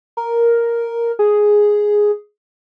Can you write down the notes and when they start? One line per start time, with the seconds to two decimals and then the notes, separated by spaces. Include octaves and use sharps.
0.17 A#4
1.19 G#4